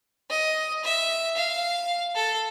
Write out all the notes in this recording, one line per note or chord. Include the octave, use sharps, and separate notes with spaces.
D#5
E5
F5
A4